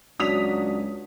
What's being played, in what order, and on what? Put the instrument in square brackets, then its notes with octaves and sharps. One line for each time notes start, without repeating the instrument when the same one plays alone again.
[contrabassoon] C#2 [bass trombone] F#3 [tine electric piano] D4 F#4 D5 [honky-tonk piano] D#6 B6 F7